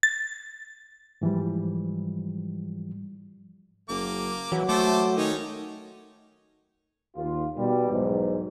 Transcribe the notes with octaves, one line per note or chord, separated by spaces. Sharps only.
A6
G#2 E3 F3 G3
F#1 A#3 D6
E3 F#3
A3 A4 C5 D6
D#3 C#4 D#4
D#2 F4
B2 G3
B1 E2 G#2